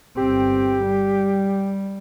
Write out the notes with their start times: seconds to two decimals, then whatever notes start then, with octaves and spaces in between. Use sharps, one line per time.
0.17 G1 C4 G4
0.85 G3